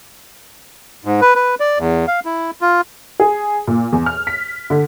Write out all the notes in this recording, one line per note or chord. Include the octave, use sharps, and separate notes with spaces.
G#2
B4
B4
D5
E2
F5
E4
F4
G#4
A#2
E2
F6
B6
D3